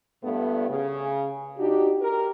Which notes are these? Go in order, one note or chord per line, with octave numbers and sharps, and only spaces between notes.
G2 A#2 A3 B3
C#3
D4 D#4 F#4 G4
G4 A#4